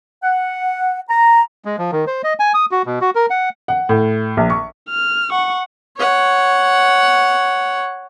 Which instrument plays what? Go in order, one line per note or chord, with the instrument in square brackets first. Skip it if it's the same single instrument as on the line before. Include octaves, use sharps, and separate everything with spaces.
[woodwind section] F#5
A#5
[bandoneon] G#3
F3
D#3
C5
D#5
G#5
D#6
F#4
B2
F#4
A#4
F#5
[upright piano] F#5
A2
A#1
C#6
[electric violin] F6
F#5 C#6
[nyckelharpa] C#5 F#5